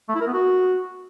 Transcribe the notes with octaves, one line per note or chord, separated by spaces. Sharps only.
A3
E4
A#4
B3
F#4